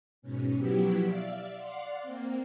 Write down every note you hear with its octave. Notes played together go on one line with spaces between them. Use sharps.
G#2 B2 C#4
B2 F3 F#3 B3 E4 G4
D5 E5 F5
D5 F5 F#5 C6
A#3 C4